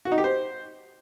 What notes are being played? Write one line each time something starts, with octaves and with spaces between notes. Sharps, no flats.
F#4
D#4
G4
C5